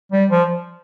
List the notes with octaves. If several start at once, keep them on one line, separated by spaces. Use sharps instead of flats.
G3
F3